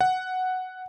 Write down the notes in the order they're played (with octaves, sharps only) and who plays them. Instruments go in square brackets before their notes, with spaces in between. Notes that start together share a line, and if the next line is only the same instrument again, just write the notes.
[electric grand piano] F#5